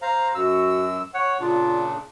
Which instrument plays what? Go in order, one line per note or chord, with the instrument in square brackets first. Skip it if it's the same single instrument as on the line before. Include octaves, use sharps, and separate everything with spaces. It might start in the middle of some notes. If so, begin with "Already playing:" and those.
[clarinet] C5 [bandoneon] F5 A#5
[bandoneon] F#2 E6 [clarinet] F#4
[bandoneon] C#5 [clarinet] F#5
[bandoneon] A#2 C#3 D4 [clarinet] F4